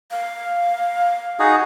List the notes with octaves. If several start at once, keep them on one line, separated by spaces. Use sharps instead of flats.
F5
D#4 F#4 G#4